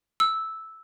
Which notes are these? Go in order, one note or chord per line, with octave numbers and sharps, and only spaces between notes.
E6